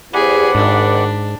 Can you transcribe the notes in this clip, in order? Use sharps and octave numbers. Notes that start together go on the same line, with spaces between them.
E2 G4 G#4 C5 D5 F#5 B5
G#1 G#2 D4